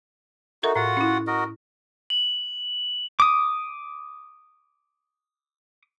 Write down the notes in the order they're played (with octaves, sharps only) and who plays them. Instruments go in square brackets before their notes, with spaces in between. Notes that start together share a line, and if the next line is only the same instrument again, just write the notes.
[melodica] D#4 F#4 [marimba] A4 A#4 E5
[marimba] A2 [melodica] F4 F#4 F#5
[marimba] C#4 E4
[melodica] F#4 A#4 D#5
[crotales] F#7
[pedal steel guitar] D6 D#6